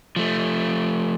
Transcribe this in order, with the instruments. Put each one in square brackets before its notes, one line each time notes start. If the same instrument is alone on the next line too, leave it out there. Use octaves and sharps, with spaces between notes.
[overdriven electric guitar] F3 A3